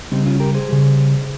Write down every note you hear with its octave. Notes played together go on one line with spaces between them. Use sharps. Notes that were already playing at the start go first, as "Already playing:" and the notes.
C#3 G3 C4 D#4
C#4 F4
G4 A#4
G#4 C5
C#3 G3